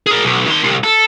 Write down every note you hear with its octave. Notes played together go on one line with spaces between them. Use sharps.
G#4 A#4
B1
D#3 C6
C2
A4